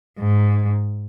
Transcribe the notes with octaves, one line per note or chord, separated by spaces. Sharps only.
G#2